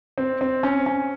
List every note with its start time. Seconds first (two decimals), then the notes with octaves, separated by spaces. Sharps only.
0.18 C4
0.41 C4
0.63 C#4
0.86 C#4